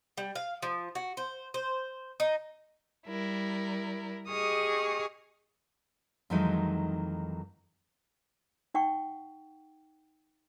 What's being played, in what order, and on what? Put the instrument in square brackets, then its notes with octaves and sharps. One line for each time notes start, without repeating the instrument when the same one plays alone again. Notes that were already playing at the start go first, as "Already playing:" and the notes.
[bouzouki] G3
F5
F3
F#4
C5
C5
D#4
[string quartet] G3 E4 A#4
G4 G#4 D#5 C#6 D#6 F6
[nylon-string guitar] F2 D#3 E3 F#3 G#3 D#4
[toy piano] D#4 F#5 G5 C#6